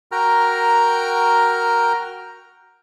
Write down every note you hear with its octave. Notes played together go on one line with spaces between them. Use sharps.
F#4 A#4 G5 A#5 F6